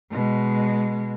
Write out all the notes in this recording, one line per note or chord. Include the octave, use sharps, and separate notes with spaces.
B2 G#3